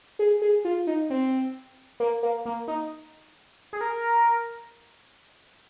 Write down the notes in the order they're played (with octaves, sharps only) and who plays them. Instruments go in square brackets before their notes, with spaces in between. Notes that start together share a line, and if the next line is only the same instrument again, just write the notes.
[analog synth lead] G#4
G#4
F4
D#4
C4
A#3
A#3
A#3
D#4
G#4
A#4